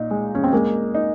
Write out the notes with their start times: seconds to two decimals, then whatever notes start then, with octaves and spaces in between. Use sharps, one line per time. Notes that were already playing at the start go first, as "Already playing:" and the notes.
Already playing: A#2 D#4
0.11 G#3
0.35 C#4
0.44 C4
0.52 G#3 A#3
0.95 D#4